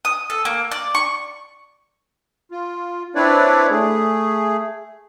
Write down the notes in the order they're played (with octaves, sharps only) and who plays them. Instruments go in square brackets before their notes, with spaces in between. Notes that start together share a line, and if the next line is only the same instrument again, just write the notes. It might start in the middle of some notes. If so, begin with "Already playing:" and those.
[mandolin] D#6
A4
A#3
D5
C#6
[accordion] F4
C4 D4 E4 B4 C#5 D5
A3 G#4